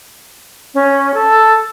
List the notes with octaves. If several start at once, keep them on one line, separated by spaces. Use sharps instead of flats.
C#4
A4